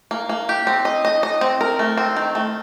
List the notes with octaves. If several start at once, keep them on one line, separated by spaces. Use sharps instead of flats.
A#3
A#3
G4
C4
D#5
D#5
D#5
C4
A#4
A3
C4
D#3
A3